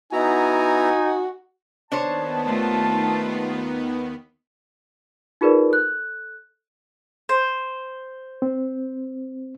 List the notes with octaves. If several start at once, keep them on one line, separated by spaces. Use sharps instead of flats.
B3 D#4 E4 F#4 G#5 A#5
D#2 D#3 B3 D4 C5 C#5 A5
A3 F4
D#4 F4 G#4 A#4 B4 D5
A4 F#6
C5
C4